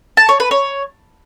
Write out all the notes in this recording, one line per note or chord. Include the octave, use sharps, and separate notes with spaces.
A5
C#5
B4
C#5